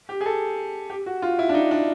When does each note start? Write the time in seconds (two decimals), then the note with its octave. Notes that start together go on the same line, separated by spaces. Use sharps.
0.09 G4
0.21 G#4
0.26 A4
0.90 G4
1.06 F#4
1.22 F4
1.39 E4
1.49 D4
1.54 D#4
1.71 D4